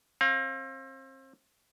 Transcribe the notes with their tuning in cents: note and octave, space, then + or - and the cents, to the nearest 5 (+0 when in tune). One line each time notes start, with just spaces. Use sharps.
C4 +35 F5 +10